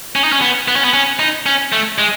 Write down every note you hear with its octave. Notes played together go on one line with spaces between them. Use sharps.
C#4
D#4
C#4
B3
B3
C#4
B3
C#4
D#4
C#4
A3
G#3